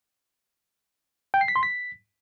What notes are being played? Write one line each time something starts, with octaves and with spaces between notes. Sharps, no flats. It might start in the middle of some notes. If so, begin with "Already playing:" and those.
G5
C7
B6
C6
B6